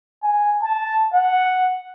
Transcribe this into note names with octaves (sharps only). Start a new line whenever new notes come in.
G#5
A5
F#5